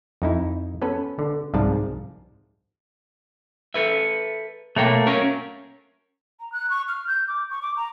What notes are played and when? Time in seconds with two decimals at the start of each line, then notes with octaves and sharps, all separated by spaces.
0.22 F2 D#4 E4
0.82 B3 C#4 A4 B4
1.19 D3
1.54 C2 G#2 F3 F4 D5 A5
3.74 A4 B4 E5
4.76 B2 A3 A#3 C#5 G5
5.07 C#4 A#4 C#5
6.40 A#5
6.52 F#6
6.70 C#6
6.88 F6
7.07 G6
7.28 D6
7.50 C#6
7.62 D6
7.77 A#5